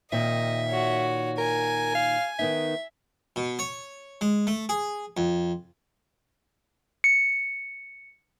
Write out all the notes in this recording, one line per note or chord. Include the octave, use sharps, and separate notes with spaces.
A#2 D#3 C4 D#5 E5
F#4 C#5
A#4 G#5
F5
D#3 B3 D#4 E5
B2
C#5
G#3
A3
G#4
F2
C#7